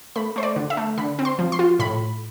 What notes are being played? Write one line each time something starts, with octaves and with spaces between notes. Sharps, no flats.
A3 B5
A3 C5
D5
D3
E5
A3
D3 B5
C4
C6
F3
C6
F4
A2 B5